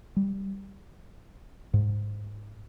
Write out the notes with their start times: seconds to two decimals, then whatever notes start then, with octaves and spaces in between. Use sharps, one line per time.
0.16 G3
1.74 G#2